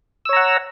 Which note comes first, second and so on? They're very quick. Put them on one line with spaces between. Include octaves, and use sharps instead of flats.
E6 C#5 A#5 F#5